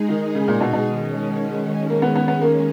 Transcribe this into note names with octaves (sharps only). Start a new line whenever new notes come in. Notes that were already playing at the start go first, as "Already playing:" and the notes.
Already playing: G#3 D#4 G#4
D#3
C#3
A#2
B2
B2
D#3 G#3 C#4
A#3
B3
B3
B3
A#3